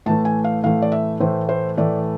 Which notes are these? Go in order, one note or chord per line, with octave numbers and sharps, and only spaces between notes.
A2 E3 A3 A5
G#5
F5
A2 E3 A3 F5
D5
E5
A2 E3 A3 C5
C5
A2 E3 A3 D5